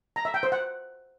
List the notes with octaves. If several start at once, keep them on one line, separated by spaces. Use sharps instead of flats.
A#5
E5
G5
C5
F#5